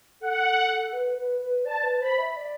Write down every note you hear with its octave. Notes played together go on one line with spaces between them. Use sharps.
A4 F#5
B4
B4
B4
D5 A5
B4
C5 B5
E5
D5